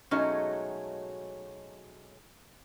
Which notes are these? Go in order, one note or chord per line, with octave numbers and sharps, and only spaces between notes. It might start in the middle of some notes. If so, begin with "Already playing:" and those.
B2 F#3 G#3 A3 C#4 D#4